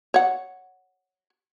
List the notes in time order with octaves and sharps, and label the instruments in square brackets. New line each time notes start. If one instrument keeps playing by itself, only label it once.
[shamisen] C#5 F#5